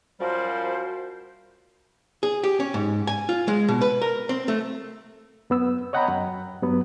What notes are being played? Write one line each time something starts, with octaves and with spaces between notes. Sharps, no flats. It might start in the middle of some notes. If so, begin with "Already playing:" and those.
F#2 F3 G3 F#4 A#4 C5
G#4
G4
C#4
G#2
G#5
F4
G#3
B2
B4
A#4
C4
A3
F#2 B3 E6
C#5 D#5 F#5 G5 A#5 B5
F#2
G2 F#3 B3